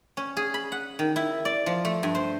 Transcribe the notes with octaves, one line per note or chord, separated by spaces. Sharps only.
C#4
G#4
B5
F#5
D#3
E4
D5
F3
A3
G2
C5